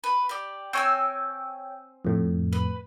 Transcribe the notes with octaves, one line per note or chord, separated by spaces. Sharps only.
B4
G4 D5
C4 C#5 G5 G#5 E6
F2 A2
B4